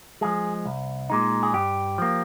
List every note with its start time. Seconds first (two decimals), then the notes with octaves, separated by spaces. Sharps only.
0.21 F3 G#3 G#4
0.66 C2
1.10 A#2 G#3 D#4
1.43 G#4
1.54 G2 G4
1.98 F3 A#3